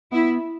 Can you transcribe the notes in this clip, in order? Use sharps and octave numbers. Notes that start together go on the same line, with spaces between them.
B3 E4